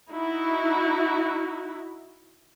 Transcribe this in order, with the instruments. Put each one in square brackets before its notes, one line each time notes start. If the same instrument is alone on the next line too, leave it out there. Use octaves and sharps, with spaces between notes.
[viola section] D#4 E4 F#4